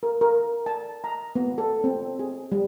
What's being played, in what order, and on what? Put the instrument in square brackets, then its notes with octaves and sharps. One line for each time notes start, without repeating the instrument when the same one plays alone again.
[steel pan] A#4
A#4
A5
A#5
B3
A4
C4
G#4
G3